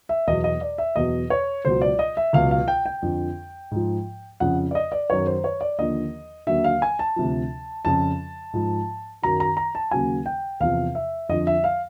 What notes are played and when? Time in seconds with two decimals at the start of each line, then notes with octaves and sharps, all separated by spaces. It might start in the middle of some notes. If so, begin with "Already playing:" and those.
0.09 E5
0.27 E2 B2 F#3 D#5
0.44 D#5
0.61 D5
0.78 E5
0.96 E2 B2 F#3 D#5
1.30 C#5
1.65 C#2 B2 F#3 C5
1.82 D5
1.99 D#5
2.17 E5
2.33 C#2 B2 F#3 F5
2.51 F5
2.68 G5
2.86 G5
3.02 F2 D3 F3
3.71 G#2 F3
4.40 F2 C#3 F3 F#5
4.71 D5
4.75 D#5
4.92 D5
5.10 F#2 D#3 F#3 C#5
5.27 C5
5.44 C#5
5.61 D5
5.78 D#2 D3 F3 D#5
6.47 D#2 D3 F#3 E5
6.64 F5
6.82 G#5
6.99 A5
7.16 D2 C3 F3
7.85 F2 C#3 F3 A5
8.53 G#2 F3
9.22 F#2 D#3 F#3 A#5
9.40 A#5
9.57 A#5
9.75 A5
9.91 D#2 C#3 F#3 G#5
10.26 G5
10.60 E2 C3 F3 F5
10.95 E5
11.29 F2 D3 F3 D#5
11.47 E5
11.64 F5